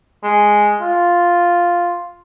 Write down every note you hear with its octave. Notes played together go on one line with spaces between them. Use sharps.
G#3
F4